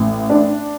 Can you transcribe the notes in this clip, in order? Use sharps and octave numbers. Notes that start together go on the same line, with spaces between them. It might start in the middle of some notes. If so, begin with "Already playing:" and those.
Already playing: A1
D4